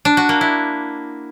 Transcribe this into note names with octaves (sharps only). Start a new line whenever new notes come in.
D4
F#4
A#3
E4